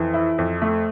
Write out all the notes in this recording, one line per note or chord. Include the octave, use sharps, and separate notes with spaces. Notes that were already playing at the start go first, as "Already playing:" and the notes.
Already playing: F2 E3
E4
F2
A3